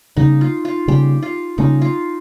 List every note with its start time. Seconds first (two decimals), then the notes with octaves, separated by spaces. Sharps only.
0.17 C#3 G3 A#3 C#4 D#4
0.41 F4
0.65 F4
0.88 C#3 G3 A#3 C#4 G4
1.23 F4
1.58 C#3 G3 A#3 C#4 D#4
1.82 F4